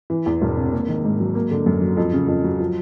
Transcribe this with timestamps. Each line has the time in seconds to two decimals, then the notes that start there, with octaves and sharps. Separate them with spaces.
0.10 E3
0.26 E2
0.42 E1
0.57 C3
0.73 A#3
0.89 D#3
1.05 G#2
1.20 F#3
1.35 A#3
1.51 D3
1.66 F#2
1.82 F#3
1.97 F2
2.13 C#3
2.28 F2
2.44 F#3
2.60 F3